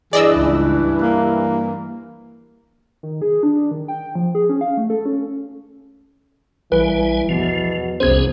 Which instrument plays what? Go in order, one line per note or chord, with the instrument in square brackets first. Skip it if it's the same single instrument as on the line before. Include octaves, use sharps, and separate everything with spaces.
[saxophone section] G2 E3 [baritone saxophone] G#4 [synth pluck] D5 D#5 E6
[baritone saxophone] C#2
A#3
[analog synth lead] D#3
G#4
D4
D#3
G5
F3
G#4
C#4
F5
A3
A4
C#4
[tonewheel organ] A#1 G3 G#5 [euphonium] E3 [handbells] B4
[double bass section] E2 [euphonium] B2 [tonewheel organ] F3
[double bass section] F1 C2 [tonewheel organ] B3 C#4 G#4 [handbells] C5 G#6